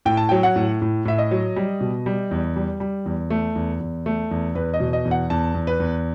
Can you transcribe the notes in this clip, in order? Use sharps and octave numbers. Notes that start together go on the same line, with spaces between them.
A2 G5
A5
F#3 G5
F#5
A2
A2
A2 E5
D#5
F#3
G3
B2
G3
E2
G3
G3
E2
A3
E2
E2
A3
E2
E2 B4
D#5
B2
D#5
E2
F#5
E2 A5
E2
B4
E2